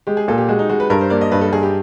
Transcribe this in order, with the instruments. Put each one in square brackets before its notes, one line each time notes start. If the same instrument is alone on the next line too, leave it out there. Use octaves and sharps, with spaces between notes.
[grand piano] G#3 [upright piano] G4
[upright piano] G#4
[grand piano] A#2 [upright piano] A4
[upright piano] G4
[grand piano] G#3 [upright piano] F#4
[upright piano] D#4
[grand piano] G#3 [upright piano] F#4
[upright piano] B4
[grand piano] G2 [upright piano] A#4
[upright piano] C5
[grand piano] A#3 [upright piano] D5
[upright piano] D#5
[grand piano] G2 [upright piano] B4
[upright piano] A4
[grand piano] G2 [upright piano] G#4
[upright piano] G4